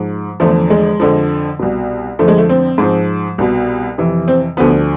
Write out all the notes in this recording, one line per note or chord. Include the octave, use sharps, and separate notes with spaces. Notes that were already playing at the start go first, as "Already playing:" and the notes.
Already playing: G#2 F3
E2 D3 F3 A3
G#3
F2 D3 F3
C2 B2
F2 D3 F3 A3
G#3
A3
C4
G#2 F3
C2 B2
F2 C3 E3
C4
D2 D3 F3 B3